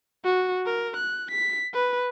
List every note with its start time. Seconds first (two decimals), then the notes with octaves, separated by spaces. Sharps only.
0.24 F#4
0.66 A#4
0.96 F#6
1.31 B6
1.74 B4